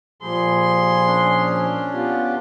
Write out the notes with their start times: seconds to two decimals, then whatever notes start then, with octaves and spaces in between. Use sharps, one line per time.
0.23 A#2 F3 A#3 G4 G#4 B5 C6
1.07 C#4 D4
1.94 B3 F4 G4